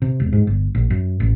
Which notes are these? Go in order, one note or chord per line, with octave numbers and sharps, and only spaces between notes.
C3
E1
G#2
G1
A#1
F#2
A1